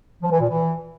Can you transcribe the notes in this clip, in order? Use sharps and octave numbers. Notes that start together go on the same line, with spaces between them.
F3
E3
A#2
E3